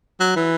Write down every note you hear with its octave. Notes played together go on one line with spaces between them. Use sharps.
F#3
E3